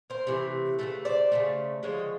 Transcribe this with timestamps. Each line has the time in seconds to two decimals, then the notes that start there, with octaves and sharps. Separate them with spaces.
0.10 A#4 C5
0.27 C3 E3 A3
0.79 C#3 F#3 A3 A4 B4
1.05 C5 D5
1.32 C#3 F3 A3
1.83 D3 F3 G#3 C#5 D#5